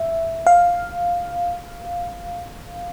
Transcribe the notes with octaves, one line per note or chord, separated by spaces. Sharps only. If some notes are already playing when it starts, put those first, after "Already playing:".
Already playing: E5
F5